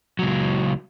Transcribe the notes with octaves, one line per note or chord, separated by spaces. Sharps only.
C#2 F#3